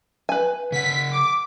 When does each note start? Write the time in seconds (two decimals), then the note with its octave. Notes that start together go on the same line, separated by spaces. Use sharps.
0.29 B4 G#5
0.72 C#3 F#5 B6
1.12 D6